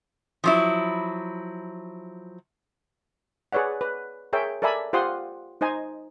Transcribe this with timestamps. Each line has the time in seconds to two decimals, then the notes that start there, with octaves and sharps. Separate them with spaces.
0.44 F3 F#3 E4
3.52 G#4 B4 C#5 D5 F#5
3.81 B4
4.33 G#4 A#4 C#5 E5 G5
4.62 A4 A#4 D5 E5 G#5 B5
4.93 F4 G4 C5 F#5 C6 D#6
5.61 D#4 C5 D#5 G#5 A#5